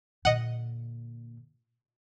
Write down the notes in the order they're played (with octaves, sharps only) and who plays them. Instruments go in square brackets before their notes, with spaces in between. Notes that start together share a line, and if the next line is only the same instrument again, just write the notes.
[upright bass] A#2 D3 [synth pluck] D#5 F#5